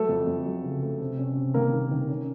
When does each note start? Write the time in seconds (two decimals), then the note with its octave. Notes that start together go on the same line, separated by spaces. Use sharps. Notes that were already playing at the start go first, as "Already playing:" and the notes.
Already playing: F#3 A3 A4
0.09 F2
0.27 F2
0.46 F#3
0.64 C#3
0.82 A3
1.00 C3
1.18 C#4
1.37 C3
1.54 D#3 A#3 A#4
1.73 D#3
1.91 D#3
2.09 C#4